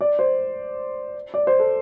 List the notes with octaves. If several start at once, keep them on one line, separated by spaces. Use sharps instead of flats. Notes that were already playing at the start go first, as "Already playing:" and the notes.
D5
C5
D5
C5
A4